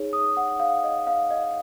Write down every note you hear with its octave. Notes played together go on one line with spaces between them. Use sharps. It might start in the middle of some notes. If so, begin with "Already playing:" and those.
Already playing: D#4 G#4 C#5
D#6
F#5
F5
D#5
F5
D#5